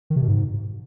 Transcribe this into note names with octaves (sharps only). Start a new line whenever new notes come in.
D#3
C3
B2
G#2